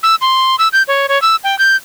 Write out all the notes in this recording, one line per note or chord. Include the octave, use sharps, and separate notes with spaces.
E6
C6
E6
G6
C#5
C#5
E6
G5
G6